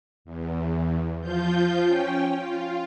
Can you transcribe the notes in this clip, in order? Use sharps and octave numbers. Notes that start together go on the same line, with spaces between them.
E2
F3 F4 G6
C#4 G5
F4